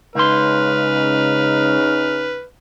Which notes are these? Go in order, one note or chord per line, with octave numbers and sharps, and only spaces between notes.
C#2 C#3 D#4 B4 C6 F6